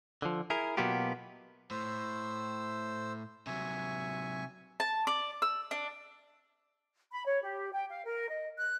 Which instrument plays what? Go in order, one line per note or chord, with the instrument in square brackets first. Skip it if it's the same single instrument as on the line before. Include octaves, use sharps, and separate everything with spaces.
[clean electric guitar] D3 F3
E4 G#4 A#4
B2 F#3 A#3 B3 F4 G4
[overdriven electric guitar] A2 [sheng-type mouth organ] C5 E6
[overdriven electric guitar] C3 F#3 [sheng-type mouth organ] E5 G#5 C#6
[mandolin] A5
D5
E6
D4
[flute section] B5
C#5
G4
G5
F5
A#4
D#5
F#6